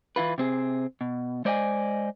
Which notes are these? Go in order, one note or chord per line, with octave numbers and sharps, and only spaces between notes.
E3 E4 F4 B4
C3 C4 G#4
B2
G#3 C5 D5 D#5 G5 G#5